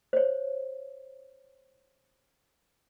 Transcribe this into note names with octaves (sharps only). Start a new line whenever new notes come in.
C5 C#5